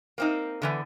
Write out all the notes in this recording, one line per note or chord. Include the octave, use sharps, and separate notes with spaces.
A#3 C4 D#4
D3 E3 B3